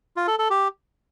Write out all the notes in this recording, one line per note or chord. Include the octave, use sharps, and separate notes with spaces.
F4
A4
A4
G4